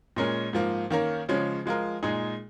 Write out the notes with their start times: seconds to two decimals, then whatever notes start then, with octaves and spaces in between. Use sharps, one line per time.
0.16 A#2 G#3 C#4 A#4
0.53 G#2 F3 A#3
0.90 D#3 A#3 C#4 A#4
1.29 C#3 F3 G#3 C#4
1.66 F3 G#3 F4 A#4
2.03 A#2 G#3 D#4 G#4